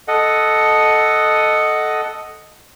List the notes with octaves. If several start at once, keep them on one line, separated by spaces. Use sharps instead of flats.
A4 D#5 F#5